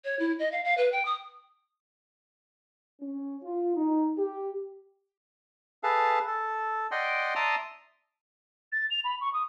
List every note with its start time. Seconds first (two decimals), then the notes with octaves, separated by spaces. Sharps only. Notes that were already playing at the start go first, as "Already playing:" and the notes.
0.04 C#5
0.19 E4
0.39 D#5
0.51 F5
0.64 F5
0.77 B4
0.92 G5
1.05 D#6
3.00 C#4
3.43 F4
3.75 D#4
4.17 G4
5.83 G#4 A4 B4 F5 A5
6.27 A4
6.91 D5 D#5 F#5 G5 C6
7.35 D5 E5 A5 A#5 C6 D#6
8.72 A6
8.91 F7
9.04 B5
9.21 C#6
9.33 D#6